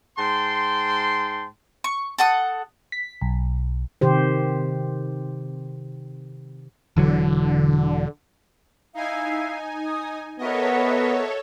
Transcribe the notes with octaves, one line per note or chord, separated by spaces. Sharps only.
G#2 G5 A5 C6
C#6
A4 F#5 D#6
B6
B1
C3 D#3 G4 C5
E1 D3 E3 F#3
D#4 E4 F5 G#5
D#6
B3 F#4 A4 A#4 C#5 D#5 E5